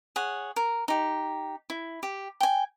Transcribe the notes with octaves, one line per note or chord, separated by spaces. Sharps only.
G#4 C#5 F#5
A#4
D#4 G4
E4
G4
G5 G#5